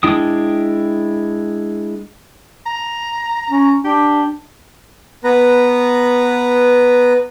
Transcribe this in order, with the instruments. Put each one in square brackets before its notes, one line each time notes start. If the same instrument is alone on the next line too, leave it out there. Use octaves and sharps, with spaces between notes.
[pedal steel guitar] G#3 D4 E4 G5 D#6
[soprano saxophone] A#5
[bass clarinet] C#4
[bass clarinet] D4 [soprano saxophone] G4
[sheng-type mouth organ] B3 B4 A#5